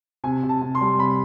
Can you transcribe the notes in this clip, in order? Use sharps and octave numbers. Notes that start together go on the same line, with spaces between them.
C3 G#5
C3
A5
C3
C6
G3
C3 B5